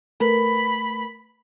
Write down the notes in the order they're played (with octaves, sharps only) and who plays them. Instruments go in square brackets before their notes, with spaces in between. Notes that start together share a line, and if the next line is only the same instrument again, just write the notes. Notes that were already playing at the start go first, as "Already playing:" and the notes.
[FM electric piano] A3 A#4 B4 [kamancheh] B5